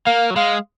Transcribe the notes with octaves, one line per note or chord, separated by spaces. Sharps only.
A#3 F5
F#3
G#3 F5